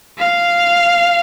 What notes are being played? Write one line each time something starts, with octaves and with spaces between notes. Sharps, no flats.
F5